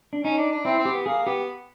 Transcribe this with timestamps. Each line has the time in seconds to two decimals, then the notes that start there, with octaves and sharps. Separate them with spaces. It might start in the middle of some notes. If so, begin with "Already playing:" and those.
0.13 D4
0.24 C#4 D#4
0.38 D4
0.52 D4
0.65 C4 E4
0.79 C4
0.85 G4
0.92 B3
1.06 A#3 G#4
1.26 B3 G4